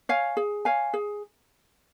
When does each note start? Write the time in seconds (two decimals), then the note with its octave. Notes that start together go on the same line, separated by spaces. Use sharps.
0.09 C#5 F5 G#5
0.37 G#4
0.65 C#5 F5 G#5
0.94 G#4